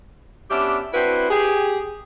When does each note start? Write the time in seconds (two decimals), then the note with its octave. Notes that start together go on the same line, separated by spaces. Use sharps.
0.50 B3 C#4 D4 G4 E5
0.93 C4 D4 E4 F#4 B4
1.29 G4 G#4